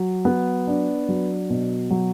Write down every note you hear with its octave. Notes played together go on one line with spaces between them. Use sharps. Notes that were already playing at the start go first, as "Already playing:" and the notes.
Already playing: F#3
B3
D4
F#3
B2
F#3